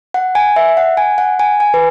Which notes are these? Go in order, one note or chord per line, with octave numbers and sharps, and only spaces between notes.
F#5
G#5
E5
F#5
G#5
F#5
G#5
G#5
B4